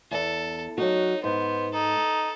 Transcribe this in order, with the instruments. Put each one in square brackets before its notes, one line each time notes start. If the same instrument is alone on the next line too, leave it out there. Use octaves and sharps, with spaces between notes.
[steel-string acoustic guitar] E2 [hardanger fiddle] A4
[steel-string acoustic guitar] F#3 F#4 [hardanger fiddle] D#4
[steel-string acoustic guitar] G#2 [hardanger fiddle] B3 [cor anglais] C5
[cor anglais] D#4 [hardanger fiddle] A4